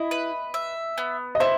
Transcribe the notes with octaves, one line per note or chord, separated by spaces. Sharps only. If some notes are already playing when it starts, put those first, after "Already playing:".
Already playing: E4 D#5
B4
E5
B3
D#5
E4 C5 E5